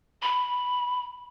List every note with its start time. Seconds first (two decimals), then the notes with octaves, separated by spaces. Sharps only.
0.22 B5